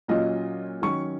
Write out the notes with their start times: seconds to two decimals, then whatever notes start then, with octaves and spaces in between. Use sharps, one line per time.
0.08 A#2 F#3 C#4 F4 D#5
0.82 D#3 F#3 C#4 C#6